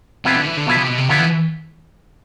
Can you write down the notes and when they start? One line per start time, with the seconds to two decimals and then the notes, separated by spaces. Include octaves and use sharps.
0.25 C3 F3 B3 E4 B4
0.36 D3
0.47 E3
0.57 D3
0.66 B2 F3 B3 E4 B4
0.77 C3
0.87 B2
0.98 C3
1.08 D3 F3 B3 E4 B4
1.20 E3